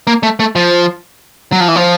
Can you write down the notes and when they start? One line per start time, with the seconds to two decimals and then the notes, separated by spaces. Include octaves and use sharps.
0.07 A#3
0.23 A3
0.40 A3
0.56 F3
1.52 F#3
1.60 F3
1.68 E3
1.76 F3